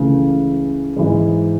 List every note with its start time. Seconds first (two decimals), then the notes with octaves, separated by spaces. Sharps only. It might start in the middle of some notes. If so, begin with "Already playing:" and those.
Already playing: C#2 C#3 E3 A3
0.96 G#2 E3 G#3